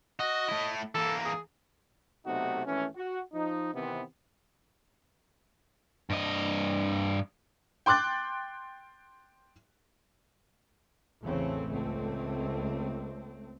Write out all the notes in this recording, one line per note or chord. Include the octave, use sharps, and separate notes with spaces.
F#4 D#5
A3 E4
E3 A#3 A4
G#4
B1 C3 A3 D#4 F#4
G#1 E3 A3 C#4
F#4
F3 D#4
C3 D#3 E3 B3 C4
G2 D#5
G5 C6 D6 F#6 A6
A1 E2 C#3 E3 A3 C4
C#2 A3 C4